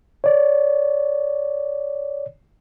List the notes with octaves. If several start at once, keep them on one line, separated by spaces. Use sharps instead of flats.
C#5 D5